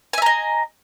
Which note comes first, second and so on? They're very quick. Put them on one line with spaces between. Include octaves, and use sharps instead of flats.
G#5 E5 A#5 D#5